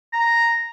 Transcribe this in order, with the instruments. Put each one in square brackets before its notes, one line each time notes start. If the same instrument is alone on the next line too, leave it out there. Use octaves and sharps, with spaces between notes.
[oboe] A#5